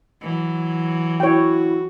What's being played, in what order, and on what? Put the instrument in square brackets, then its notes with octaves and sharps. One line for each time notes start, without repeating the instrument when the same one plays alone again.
[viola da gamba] E3 F#3
[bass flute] E4 [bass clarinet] F#4 [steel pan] C#5 G5